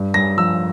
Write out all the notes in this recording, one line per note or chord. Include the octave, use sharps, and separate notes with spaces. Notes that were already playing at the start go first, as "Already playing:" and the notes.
Already playing: G2
G2 A#6
F3 E6